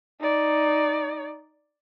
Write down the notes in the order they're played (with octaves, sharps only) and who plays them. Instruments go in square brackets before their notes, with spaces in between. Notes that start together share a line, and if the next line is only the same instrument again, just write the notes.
[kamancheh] D#4 D5